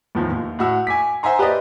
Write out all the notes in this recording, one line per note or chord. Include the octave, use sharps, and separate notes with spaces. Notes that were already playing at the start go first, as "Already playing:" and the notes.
E2 A2 D#3 F3
D#2
A2 F#4 E6
G#5 D6 B6
C5 E5 F#5 G#5 A#5 C6
G4 B4 C5 D5 D#5